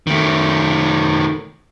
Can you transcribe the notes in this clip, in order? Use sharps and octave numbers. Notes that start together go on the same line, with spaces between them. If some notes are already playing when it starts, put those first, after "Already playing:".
D#3 A3